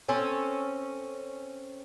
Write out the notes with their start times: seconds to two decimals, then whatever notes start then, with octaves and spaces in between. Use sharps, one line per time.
0.08 C4 C#4 A4 G#5